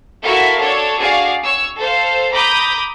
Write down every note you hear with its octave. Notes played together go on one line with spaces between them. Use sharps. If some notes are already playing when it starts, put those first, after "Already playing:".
E4 F#4 A4 A#4 E5 F5
D4 A4 C#5
F#4 G#4 D5 F5
C#5 E6
A4 C5 F5
A#5 B5 D6 D#6 G6